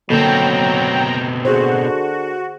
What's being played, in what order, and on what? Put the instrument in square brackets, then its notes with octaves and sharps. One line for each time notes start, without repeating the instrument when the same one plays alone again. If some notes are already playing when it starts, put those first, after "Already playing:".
[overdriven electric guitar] B2 C4 [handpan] D3 A#3 A4 [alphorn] F#3 [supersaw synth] G5 A#5
[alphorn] D3 [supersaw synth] F#4 [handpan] G#4 C5